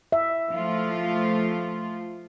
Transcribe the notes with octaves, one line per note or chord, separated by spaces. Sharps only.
E5
F3 A3 F4